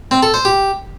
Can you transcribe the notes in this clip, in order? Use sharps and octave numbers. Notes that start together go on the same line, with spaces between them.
C4
A4
C5
G4